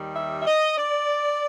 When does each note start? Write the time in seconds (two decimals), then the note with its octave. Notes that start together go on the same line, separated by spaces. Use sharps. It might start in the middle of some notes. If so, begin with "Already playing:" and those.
Already playing: D#2 D#3 G3
0.16 E5
0.42 E5
0.47 D#5
0.78 D5